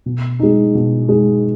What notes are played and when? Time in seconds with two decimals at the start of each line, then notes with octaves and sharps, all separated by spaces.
0.06 B2
0.40 G#3 D#4
0.75 B2
1.09 G#3 D#4